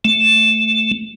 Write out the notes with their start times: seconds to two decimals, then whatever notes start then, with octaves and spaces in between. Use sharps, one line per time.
0.05 A3